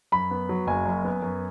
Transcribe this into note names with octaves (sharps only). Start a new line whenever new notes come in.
F#2 B5
B3
F#3
F#1 G#5
F#2
B3
F#2